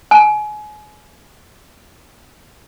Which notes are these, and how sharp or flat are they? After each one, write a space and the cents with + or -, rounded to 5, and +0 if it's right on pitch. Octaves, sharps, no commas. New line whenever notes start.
G#5 +30